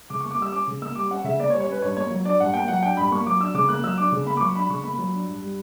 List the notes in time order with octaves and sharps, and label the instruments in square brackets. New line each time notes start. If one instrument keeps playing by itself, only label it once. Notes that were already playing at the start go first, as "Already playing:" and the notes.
[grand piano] C#3 D6
C#6
A#3
D6
G3 E6
C#4 D6
C#3
A#3 E6
G3 D6
C#4 F#5
C#3 E5
A#3 D5
C#5
G3
C#5
C#4 B4
B4
G2 C#5
A#3 C#5
F#3
D4 D5
G2 F#5
A#3 G5
F#3 F#5
D4 G5
G2 B5
A#3 C#6
F#3 D6
D4 E6
C#3 D6
A#3 F#6
F#3 E6
D4 D6
C#3
A#3 B5
D6
F#3 C#6
D4 B5
C#3 C#6
A#3 B5
F#3
D4
G2
G3